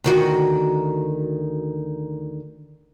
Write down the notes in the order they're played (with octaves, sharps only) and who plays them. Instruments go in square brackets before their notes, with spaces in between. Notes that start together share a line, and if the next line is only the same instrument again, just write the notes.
[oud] D2 D#3 F#4